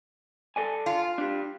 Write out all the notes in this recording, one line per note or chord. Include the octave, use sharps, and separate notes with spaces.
A4 D5 G#5
F4
D4 G4